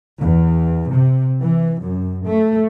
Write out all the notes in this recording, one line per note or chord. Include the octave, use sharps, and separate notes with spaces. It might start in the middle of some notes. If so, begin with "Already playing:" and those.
E2
C3
E3
F#2
A3